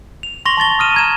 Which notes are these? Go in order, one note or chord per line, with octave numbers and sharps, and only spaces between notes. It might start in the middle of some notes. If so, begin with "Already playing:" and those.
F7
C6 C#6 A#6 F7 G7
A5 C6 A6 G7
D#6 F6 D#7 E7
A#5 G#6 E7